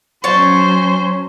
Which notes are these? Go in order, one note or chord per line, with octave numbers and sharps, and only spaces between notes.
F#3 C#4 C5 C#5 A5